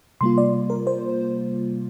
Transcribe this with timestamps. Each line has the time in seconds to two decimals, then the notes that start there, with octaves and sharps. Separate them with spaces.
0.21 C3 G3 A#3 F4 C6
0.38 D5
0.70 A#4
0.87 C5